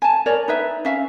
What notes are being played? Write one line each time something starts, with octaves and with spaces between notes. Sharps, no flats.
G#5 A5
A#4 C#5 D5
D#4 B4 E5
C#4 E5 F5